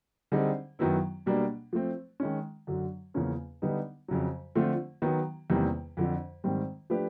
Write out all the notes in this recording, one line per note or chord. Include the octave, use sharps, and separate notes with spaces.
D3 G3 C4 D#4 G#4
F#2 D#3 F#3 B3 E4
B2 G3 A#3 D4
F3 A3 C4
D#3 G#3 C#4
F#2 D3 F#3
E2 C#3 F3 A#3 C#4
D3 G3 B3 D#4
F2 C#3 F#3
D3 F3 A3 C4 F4
D#3 F#3 B3
E2 C3 D#3 G3 A#3
F2 D3 F3
G#2 D#3 G3 C4
F3 A3 D4 G4 B4